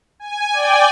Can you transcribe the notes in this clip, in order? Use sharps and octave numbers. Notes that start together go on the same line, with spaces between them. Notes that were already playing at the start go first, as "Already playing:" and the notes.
G#5
D5 G5 G#5